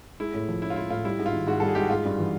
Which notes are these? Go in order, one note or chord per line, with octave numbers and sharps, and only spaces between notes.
G#3 E4
A2
F3
C#4 E4
F4
G#3 E4
A2 F4
G3 E4
G#2
F4
D#3
G#2 F#4
G3 A4
G#4
G#2 G4
F#4
G#3 F4
G2
E3